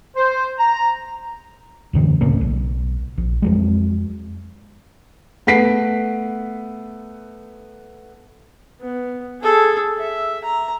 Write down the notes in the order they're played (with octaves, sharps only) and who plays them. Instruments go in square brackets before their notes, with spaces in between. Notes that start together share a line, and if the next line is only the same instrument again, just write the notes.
[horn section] C5
A#5
[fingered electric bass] C2 F#2 D3 E3
D1 A2 C#3 A#3
B1
A#1
F2 F#3 G#3
[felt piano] A3 B3 F#5 B6 C7 D7
[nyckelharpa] B3
G#4 A4
E5
A#5